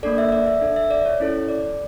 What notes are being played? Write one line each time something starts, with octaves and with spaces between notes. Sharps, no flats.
A#3 D4 A4 D5
E5
D5
E5
D4 A4
E5
D5
C#5
C#4 E4 A4
D5